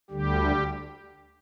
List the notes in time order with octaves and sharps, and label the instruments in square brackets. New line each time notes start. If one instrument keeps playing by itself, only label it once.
[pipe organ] D2 D3 G3 G4